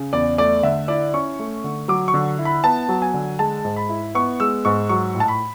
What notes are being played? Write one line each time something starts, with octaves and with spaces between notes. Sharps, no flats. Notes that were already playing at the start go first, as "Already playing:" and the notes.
Already playing: C#3
E2 D5
A3 D5
D3 E5
E4 D5
C#4 C#6
A3
D3
F#3 D6
C#6
D3
E4
B5
B3 A5
F#3
G#5
D3
G#3 A5
G#2
B5
E4
B3 C#6
G#3 E6
G#2 C#6
F#3 C#6
A2
A5
B5